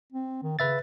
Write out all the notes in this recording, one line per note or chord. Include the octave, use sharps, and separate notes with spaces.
C4
D#3
C#3 B4 E5 A6